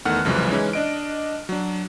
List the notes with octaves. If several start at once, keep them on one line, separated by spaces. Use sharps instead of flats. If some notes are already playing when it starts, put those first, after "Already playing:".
E2 D#3 A3 F#5 F6 F#6
C2 F2 C#3 E3 F#3 G#3
E3 G#3 C#4 D#4 E4
D4 D#5 D7
F#3 D4